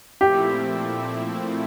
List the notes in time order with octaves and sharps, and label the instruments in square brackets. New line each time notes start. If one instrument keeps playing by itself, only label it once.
[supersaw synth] A#2 F3 A3 C4 E4 [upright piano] G4